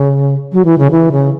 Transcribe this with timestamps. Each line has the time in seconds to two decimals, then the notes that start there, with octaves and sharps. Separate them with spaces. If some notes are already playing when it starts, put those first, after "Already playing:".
Already playing: C#3
0.52 F#3
0.65 E3
0.78 C#3
0.91 E3
1.12 C#3